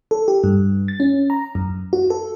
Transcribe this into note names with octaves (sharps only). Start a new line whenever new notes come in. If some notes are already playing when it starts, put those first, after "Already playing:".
A4
G4
G2
A6
C#4
A#5
F#2
F#4
A4